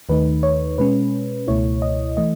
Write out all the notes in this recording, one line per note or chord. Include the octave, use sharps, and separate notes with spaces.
D#2 D#3 A3 D#4 B4
C#5
B2 G#3 C#4 B4
C#2 B2 A3 E4 C#5
D#5
E3 A3 D#5